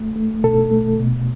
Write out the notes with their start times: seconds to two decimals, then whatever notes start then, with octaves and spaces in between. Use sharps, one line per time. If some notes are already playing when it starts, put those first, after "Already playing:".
Already playing: A3
0.16 A3
0.44 B2 A4
0.71 A3
0.99 B2